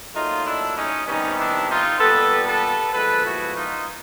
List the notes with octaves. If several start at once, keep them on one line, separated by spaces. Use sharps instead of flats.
A#2 F#3 A3 D#4 F4
D4 E4
C#4 D#4
C3 D#3 G3 B3 C#4 D#4
D4 E4
D#4 F4
A#2 G3 B3 A4 B4
A4 B4
A#2 F3 G#3 B3 A4 B4
E4 F#4
D#4 F4